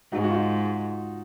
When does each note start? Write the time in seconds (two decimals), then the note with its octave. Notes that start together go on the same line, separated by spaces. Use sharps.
0.12 G#2 D#4 F#4
0.23 D#4 F#4
0.30 F4
0.34 D#4 F#4